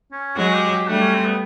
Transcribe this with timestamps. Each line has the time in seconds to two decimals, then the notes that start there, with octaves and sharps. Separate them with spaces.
0.12 C#4
0.36 F#3 G#3 F#4
0.54 G4
0.71 G4
0.88 G3 A3 D4
1.01 C#4
1.13 C4
1.26 B3